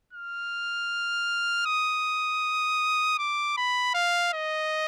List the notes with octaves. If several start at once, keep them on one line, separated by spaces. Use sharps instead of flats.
F6
D#6
D6
B5
F5
D#5